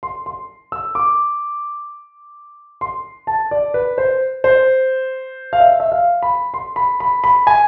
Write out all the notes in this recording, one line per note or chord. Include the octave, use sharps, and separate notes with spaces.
C6
C6
E6
D6
C6
A5
D5
B4
C5
C5
F5
E5
E5
F5
B5
C6
B5
B5
B5
G#5